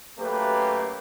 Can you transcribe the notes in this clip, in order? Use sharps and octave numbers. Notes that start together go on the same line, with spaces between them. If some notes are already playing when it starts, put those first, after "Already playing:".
F#2 A3 A#3 G4 B4